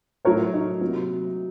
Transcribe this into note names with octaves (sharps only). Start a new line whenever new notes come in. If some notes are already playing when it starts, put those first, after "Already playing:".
A2 F#3 A3 A#4 C#5
D#4
C3 F#3 A#3